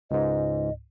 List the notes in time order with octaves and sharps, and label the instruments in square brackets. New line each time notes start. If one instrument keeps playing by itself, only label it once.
[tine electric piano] C#2 G#2 [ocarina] D#5